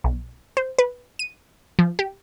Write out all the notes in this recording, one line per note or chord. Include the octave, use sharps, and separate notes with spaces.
B1
C5
B4
D#7
F3
G4